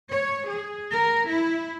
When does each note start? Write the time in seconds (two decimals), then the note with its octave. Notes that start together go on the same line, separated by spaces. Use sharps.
0.10 C#5
0.47 G#4
0.92 A#4
1.28 E4